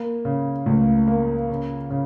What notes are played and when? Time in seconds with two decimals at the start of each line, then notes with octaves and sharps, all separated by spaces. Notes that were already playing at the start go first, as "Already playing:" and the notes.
Already playing: A#3
0.25 C#3
0.66 C#2 A3
1.08 A#3
1.50 C#3
1.90 C#3